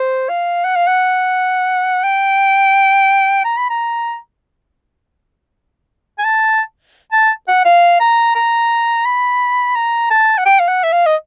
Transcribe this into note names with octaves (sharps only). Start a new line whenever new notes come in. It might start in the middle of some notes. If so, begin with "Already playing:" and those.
Already playing: C5
F5
F#5
F5
F#5
G5
A#5
B5
A#5
G#5
A5
A5
F#5
F5
A#5
A#5
B5
A#5
A5
F#5
G5
F5
F#5
E5
F5
D#5